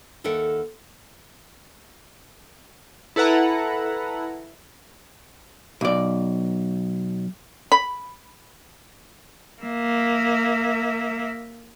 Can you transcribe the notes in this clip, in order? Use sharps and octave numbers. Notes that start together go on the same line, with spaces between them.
D#2 A4 A#4 E5 F#5
E4 A4 B4 F#5 A#5
B1 D5
B5
A#3 E5